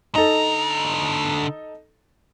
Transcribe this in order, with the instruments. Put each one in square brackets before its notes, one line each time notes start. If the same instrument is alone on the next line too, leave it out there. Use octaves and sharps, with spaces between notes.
[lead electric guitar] D3 A#5 [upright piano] D#4 A4